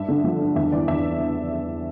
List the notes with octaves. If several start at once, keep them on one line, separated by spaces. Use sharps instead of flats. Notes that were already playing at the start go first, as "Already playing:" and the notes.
Already playing: G2 E5
D3
F3
G2
E2 E5
E3 D5
E2 E5